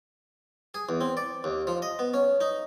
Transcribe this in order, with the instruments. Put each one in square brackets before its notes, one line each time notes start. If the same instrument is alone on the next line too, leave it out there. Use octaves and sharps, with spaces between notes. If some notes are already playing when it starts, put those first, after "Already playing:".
[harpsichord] G#4
E2
C4
D5
D#2
F3
D#5
B3
C#4
D#4